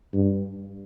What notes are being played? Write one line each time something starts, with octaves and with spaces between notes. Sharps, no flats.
G2